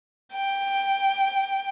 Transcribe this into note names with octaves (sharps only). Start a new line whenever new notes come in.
G5